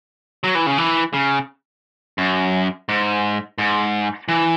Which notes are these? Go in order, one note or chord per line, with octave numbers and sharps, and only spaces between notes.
F#3
E3
C#3
E3
C#3
F#2
G#2
G#2
E3